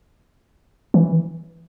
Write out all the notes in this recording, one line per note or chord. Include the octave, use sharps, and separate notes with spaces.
E3